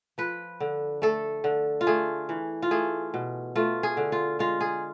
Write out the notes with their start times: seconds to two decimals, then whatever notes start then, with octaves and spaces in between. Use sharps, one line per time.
0.18 F3 B4
0.60 D3
1.02 A3 A4
1.44 D3
1.81 F4
1.87 A3 G#4
2.29 E3
2.62 F4
2.71 A3 G#4
3.14 B2
3.56 A3 F4
3.83 G#4
3.97 D3
4.12 F4
4.39 G#3 F4
4.61 G#4